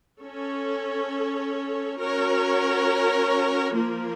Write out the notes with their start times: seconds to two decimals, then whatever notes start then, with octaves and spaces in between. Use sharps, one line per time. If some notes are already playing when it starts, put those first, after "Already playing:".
0.21 C#4 A4 C#5
1.99 C#4 F#4 A#4 C#5
3.75 F3 A#3 F4 A#4